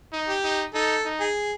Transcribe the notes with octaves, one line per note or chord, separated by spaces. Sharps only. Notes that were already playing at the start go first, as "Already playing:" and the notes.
D#4
G4
D#4
D#4 A4
D#4
G#4